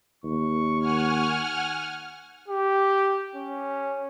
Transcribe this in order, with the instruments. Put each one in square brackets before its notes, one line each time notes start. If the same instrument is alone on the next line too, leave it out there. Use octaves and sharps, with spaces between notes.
[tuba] D#2 [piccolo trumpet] C#6
[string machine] F#5 G#5 F6
[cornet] G4
C#4